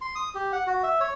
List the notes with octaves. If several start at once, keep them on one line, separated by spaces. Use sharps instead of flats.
C6
D#6
G4
F#5
F#4
E5
C#5